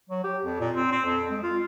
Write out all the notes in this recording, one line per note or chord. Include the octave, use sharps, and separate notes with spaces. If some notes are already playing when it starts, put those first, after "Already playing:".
F#3
G4
F2
A#2
C4
C4
F2
G#3
F4